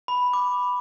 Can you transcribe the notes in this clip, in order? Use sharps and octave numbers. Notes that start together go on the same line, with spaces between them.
B5
D6